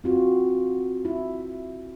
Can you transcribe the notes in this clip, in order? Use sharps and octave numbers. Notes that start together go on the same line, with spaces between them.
C4 F4 F#4
E4